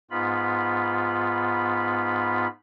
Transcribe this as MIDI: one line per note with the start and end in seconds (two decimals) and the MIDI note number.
0.11 2.47 44
0.11 2.47 59
0.11 2.47 65
0.11 2.47 83